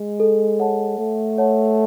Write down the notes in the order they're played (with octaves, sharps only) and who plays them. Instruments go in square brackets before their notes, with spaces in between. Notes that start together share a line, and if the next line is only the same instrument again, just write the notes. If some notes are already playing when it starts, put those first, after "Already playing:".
Already playing: [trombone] G#3
[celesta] A4
C#5 F#5 A5
[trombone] A3 [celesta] A4
[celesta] C#5 F#5 A5